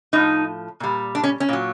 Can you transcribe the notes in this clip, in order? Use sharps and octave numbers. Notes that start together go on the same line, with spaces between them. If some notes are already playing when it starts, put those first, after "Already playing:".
A2 F3 D#4
A#2 G3
D4
C#4
C#4
A#2 F#3